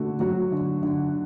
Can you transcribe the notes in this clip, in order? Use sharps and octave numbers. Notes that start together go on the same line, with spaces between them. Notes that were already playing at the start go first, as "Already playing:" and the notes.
Already playing: D3 A3 F#4
F#3 F#4
D3
D3